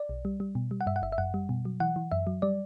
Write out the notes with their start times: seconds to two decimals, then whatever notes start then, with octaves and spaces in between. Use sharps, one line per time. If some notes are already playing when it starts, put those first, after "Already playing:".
Already playing: D5
0.09 B1
0.25 G3
0.40 G3
0.55 B2
0.71 G3
0.81 F#5
0.86 G2 E5
0.96 F#5
1.02 G1 E5
1.12 E5
1.18 F#2 F#5
1.34 G3
1.49 B2
1.65 F#3
1.80 E3 F#5
1.96 E3
2.12 F#2 E5
2.27 F#3
2.42 G3 D5